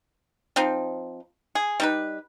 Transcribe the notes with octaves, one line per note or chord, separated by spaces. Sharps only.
F3 C4 D#4
G#4
G3 D#4 B4